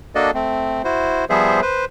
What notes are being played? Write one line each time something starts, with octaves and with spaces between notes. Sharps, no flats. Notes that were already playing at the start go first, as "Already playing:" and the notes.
A#3 D4 F#4 A4 D5 D#5
A3 C4
E4 F#4 C5
F3 G3 B3 G#4 C5 E5
B4 C5